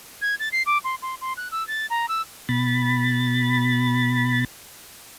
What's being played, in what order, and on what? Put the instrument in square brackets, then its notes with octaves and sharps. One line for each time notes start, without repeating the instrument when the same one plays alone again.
[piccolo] G#6
A6
C7
D6
C6
C6
C6
F#6
E6
A6
A#5
E6
[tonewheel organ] B2 B5 A6